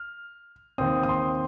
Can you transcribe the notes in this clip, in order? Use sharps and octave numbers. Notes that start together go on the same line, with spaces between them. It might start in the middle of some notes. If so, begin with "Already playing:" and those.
Already playing: F6
D#2 D#3 C4 D#6
D#6
C6